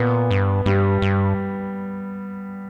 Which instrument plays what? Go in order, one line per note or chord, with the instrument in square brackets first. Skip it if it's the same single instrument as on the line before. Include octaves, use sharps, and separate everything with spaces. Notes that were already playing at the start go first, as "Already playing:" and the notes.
Already playing: [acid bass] A#2 [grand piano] B3
[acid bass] G2
[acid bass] G2 [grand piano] G3
[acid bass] G2